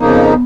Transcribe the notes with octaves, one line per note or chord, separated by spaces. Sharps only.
F2 C#3 F3 A#3 B3 D#4